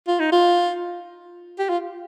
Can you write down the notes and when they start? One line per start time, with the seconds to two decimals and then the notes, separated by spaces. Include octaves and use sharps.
0.08 F4
0.20 D#4
0.32 F4
1.59 G4
1.69 F4